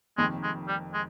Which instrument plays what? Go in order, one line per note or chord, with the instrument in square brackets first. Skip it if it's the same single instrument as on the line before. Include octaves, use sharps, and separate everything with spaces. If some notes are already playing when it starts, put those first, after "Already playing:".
[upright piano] F1 F2 D#3 A#3 [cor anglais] G#3
[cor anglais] G#3
G3
G#3